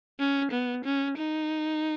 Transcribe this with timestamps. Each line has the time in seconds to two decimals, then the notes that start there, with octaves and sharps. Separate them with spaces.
0.20 C#4
0.52 B3
0.85 C#4
1.18 D#4